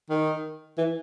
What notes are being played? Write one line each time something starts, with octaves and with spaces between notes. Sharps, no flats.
D#3
E3